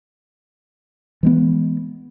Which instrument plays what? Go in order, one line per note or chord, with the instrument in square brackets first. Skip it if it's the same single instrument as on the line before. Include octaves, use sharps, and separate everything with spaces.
[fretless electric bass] E3 G#3 B3